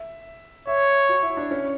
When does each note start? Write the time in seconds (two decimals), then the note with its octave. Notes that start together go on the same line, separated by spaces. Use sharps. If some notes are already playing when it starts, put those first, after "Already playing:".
Already playing: E5
0.67 C#5 E5
1.09 F#4
1.23 E4
1.37 D4
1.51 C#4